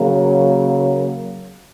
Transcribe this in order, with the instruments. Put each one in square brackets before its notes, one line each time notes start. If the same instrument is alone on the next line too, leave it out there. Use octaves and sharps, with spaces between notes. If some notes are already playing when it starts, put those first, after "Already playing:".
Already playing: [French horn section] C#3 F#3 A#3